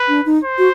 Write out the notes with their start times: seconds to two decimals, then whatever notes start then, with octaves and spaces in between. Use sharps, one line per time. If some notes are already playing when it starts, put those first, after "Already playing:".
Already playing: B4
0.08 D4
0.26 D#4
0.44 C5
0.58 F#4